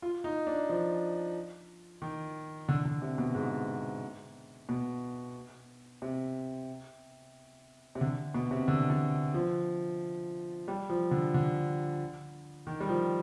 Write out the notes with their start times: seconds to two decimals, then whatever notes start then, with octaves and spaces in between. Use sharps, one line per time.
0.02 F4
0.24 D#4
0.47 D4
0.69 F3
2.02 D#3
2.69 D3
2.85 D3
3.02 C3
3.18 B2
3.35 G#2
4.69 B2
6.02 C3
7.95 C3
8.01 D3
8.34 B2
8.51 C3
8.68 D3
8.90 D3
9.34 F3
10.68 G3
10.90 F3
11.11 D3
11.34 D3
12.67 D#3
12.80 G3
12.89 F3